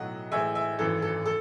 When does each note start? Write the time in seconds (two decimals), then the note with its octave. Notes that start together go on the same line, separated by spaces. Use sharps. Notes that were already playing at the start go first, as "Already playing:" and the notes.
Already playing: B1 A2 F#3 D#5 F#5
0.32 A1 A2 G#3 E5 G#5
0.55 E5 G#5
0.79 G#1 F#2 E3 A4
1.02 A4
1.26 A4